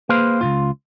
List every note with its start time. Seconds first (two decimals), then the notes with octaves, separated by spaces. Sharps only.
0.09 A#3 G#4 B4 C5 F5
0.41 C#2 A#2 F4